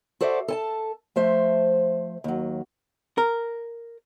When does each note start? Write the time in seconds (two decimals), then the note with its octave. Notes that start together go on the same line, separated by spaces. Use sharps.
0.21 F#4 A4 C5 D5 E5 F#5
0.48 A4 G#5 A5
1.16 F3 A3 C5 E5
2.24 D#2 F#3
3.18 A#4